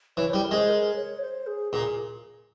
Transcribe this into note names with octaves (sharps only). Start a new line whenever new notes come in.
E3 C#5
G3 C5
A#4
G#3 C5
A#4
C#5
C5
G#4
A#2 G#4